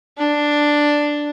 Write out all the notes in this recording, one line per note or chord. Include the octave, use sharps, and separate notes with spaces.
D4